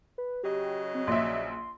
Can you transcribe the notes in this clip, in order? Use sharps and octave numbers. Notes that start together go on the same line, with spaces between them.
B4
C#3 F#3 G4 D#5
C4
A#1 E5 C6